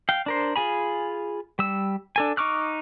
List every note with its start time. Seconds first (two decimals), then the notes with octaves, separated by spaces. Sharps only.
0.09 F5 G5
0.26 D4 A#4 C5
0.56 F4 G#4 G#5 B5
1.59 G3 E6
2.16 D4 A4 G#5
2.37 D#4 C#6 D6 F6 F#6